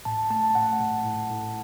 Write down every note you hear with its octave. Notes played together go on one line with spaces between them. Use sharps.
A2 A5
A3 A5
A2 F#5
A2
A2
A2